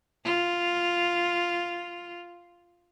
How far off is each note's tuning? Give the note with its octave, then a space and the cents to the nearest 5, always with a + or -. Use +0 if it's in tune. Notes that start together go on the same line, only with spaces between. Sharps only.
F4 -5